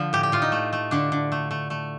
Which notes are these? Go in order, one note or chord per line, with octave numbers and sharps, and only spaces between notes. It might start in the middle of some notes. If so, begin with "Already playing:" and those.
Already playing: D3 F3
A2 G4
G4
A2 F4
D#4
A3
A3
D3 D4
D3
A3
A3
A3